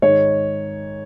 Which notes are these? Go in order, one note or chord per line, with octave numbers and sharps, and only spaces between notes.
G#2 D#3 C#5